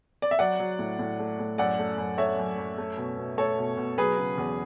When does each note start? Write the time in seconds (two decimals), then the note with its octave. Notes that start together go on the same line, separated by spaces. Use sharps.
0.22 D5
0.31 E5
0.39 F#3 D5 F#5
0.60 F#3
0.79 A2
0.99 A2
1.19 A3
1.39 A2
1.58 F#2 D5 F#5
1.79 A3
1.98 F#2
2.18 A3 C#5 E5
2.38 F#2
2.58 F#2
2.78 A3
2.97 B2
3.18 B2
3.38 A3 A4 C#5
3.58 B2
3.77 B2
3.98 F#3 G#4 B4
4.18 C#3
4.38 E2